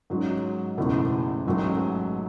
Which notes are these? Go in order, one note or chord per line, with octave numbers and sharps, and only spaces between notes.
G#2 F#3 C#4 F#4
F#1 E2 B2 A3 E4
A1 G#2 F#3 A3